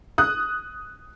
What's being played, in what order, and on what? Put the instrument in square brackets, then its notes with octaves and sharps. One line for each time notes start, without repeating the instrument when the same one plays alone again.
[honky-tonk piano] D#6 F#6